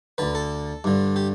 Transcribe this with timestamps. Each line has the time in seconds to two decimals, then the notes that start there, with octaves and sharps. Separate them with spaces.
0.18 D2 D3 B4
0.35 A4
0.84 G2 D3
1.16 G4